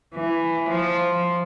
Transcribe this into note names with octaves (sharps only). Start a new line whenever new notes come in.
E3
F3